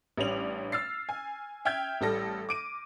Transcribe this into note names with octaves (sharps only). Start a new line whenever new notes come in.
A1 G3 C#4 D4 F7 F#7
E6 F6 A6 C7
G#5
E5 G5 F6 G6 G#6
A1 G3 A4 A#6
D6 D7 D#7